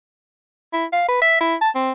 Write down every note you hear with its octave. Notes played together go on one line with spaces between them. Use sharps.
E4
F5
B4
E5
E4
A5
C4